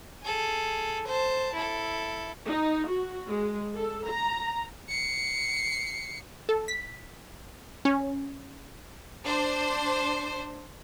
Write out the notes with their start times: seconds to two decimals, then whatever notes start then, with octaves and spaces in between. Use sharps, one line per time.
0.22 G#4 A4
1.07 C5 A5
1.53 E4 A4
2.48 D#4
2.89 F#4
3.28 G#3
3.76 A4
4.07 A#5
4.89 C7 C#7
6.49 A4
6.68 B6
7.85 C#4
9.25 D4 C5